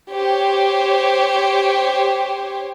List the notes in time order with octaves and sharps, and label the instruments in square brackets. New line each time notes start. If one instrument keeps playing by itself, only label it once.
[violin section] G4 C5 C#5